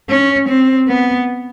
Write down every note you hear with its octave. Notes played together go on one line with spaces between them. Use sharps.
C#4
C4
B3